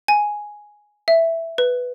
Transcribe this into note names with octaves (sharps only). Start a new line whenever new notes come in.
G#5
E5
B4